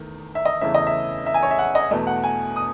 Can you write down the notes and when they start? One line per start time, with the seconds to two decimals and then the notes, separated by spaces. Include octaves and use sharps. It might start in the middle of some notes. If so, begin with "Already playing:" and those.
Already playing: E2 D#3 A3
0.35 E5
0.45 D#5
0.61 E2 C#3 E3 A3 C#4 E5
0.74 D#5
0.87 E5
1.26 E5
1.34 G#5
1.43 C#5
1.51 E5
1.59 F#5
1.75 D#5
1.91 E2 B2 A3 D#5
2.07 F#5
2.24 G#5
2.56 D#6